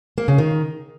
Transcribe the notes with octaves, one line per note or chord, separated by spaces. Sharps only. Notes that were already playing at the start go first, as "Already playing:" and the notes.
A#3
C#3
D#3